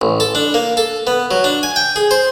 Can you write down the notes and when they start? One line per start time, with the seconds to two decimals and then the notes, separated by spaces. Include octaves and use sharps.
0.01 A1
0.20 A4
0.35 D4
0.54 A#3
0.77 A4
1.07 B3
1.31 F#3
1.44 D4
1.63 G#5
1.76 G5
1.96 G#4
2.11 C5